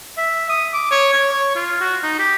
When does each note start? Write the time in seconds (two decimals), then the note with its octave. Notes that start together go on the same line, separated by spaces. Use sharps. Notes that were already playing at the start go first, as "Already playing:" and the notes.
0.18 E5
0.50 D#6
0.74 D6
0.91 C#5
1.13 C#5
1.33 C#5
1.56 F4
1.81 F#4
2.03 D#4
2.19 G4